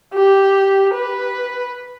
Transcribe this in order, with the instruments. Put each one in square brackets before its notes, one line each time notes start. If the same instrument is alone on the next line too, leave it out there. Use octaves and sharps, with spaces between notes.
[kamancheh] G4
B4